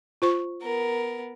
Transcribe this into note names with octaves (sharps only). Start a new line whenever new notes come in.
F4 C5 C#6
B3 A#4